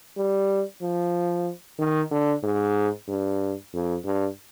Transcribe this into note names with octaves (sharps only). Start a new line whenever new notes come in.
G3
F3
D#3
D3
G#2
G2
F2
G2